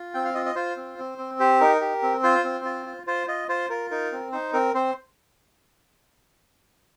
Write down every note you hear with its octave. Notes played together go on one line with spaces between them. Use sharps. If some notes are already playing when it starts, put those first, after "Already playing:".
Already playing: F4
C4 G5
F5
F4 D#5
D#5
F4 C5
C4
C4
C4
G4 C5
D#4 A#4
G4
C4
F4 C5
C4
F4
F4
F4 C5
F4 D#5
F4 C5
F4 A#4
D#4 A#4
C4
D#4 C5
C4 A#4
C4 C5